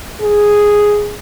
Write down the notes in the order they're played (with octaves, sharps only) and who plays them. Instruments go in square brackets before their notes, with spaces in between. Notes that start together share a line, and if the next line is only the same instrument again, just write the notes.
[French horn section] G#4